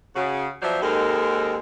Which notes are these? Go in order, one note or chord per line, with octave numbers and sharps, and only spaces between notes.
C#3 F#4
F3 F#3 B3 C5 D5 E5
D#2 G#3 C4 D#4 A4 A#4